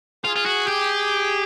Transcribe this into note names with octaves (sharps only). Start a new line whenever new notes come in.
F4 G#4
F4
F#4
G4